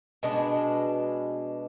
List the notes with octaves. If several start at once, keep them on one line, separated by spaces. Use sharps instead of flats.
B2 G#3 D4